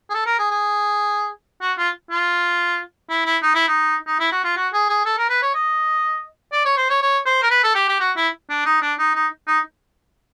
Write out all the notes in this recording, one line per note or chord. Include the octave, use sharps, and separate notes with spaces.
G#4
A4
A#4
G#4
G#4
F#4
F4
F4
E4
E4
D#4
E4
D#4
D#4
E4
F#4
F4
F#4
G#4
G#4
A4
A#4
B4
C#5
D#5
D5
C#5
C5
C#5
C#5
C5
A#4
B4
A4
G4
G4
F#4
E4
D4
D#4
D4
D#4
D#4
D#4